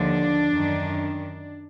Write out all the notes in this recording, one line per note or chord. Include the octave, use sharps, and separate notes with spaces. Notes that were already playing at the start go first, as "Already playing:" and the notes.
Already playing: D#2 D3 F3 D4
F#2 D#3